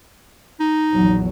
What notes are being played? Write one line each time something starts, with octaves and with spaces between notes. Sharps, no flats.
D#4
A#1 E2 F#3